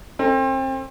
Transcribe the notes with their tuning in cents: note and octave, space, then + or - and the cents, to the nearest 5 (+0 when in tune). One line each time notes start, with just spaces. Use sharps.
C4 +30 A4 +25